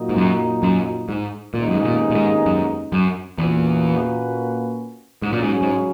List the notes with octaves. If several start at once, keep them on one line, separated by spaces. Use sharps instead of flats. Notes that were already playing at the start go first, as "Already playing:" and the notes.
Already playing: A#2 F#3 A#3 D#4
G#2
F#2
F#2
G#2
D#2 A#2 C#3 G#3 B3 D#4
F#2
G#2
A#2
A#2
G#2
F#2
F#2
E2 A#2 A#3 C#4 F#4 B4
G#2 C#3 F#3 C#4
A#2
G#2
G#2